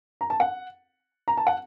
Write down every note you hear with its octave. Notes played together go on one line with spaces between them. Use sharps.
A#5
A5
F#5
A#5
A5
F#5